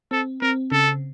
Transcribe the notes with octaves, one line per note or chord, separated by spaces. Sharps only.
C4 A4
C4 A#4
C#3 A4